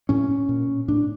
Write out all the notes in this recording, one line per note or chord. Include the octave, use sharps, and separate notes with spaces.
A2 C#4
A#2
A2 D4